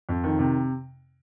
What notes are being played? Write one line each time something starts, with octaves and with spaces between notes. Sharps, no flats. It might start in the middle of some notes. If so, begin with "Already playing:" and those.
F2
D#3
C3